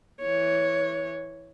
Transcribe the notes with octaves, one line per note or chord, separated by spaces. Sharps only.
E3 C#5